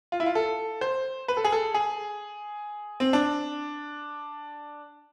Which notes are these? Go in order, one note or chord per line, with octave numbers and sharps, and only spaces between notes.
F4
E4
F4
A4
C5
B4
A4
G#4
A4
G#4
C4
D4